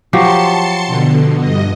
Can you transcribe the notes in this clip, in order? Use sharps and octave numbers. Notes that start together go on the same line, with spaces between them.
F3 F#3 G4 A5 C6 C#7
B2 D3
G2 D#5